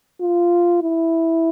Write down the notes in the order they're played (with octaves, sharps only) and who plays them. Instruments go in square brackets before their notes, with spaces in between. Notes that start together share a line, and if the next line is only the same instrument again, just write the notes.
[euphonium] F4
E4